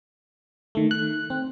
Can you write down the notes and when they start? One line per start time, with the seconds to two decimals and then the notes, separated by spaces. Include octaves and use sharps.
0.75 D#3 A3
0.91 F#6
1.30 C4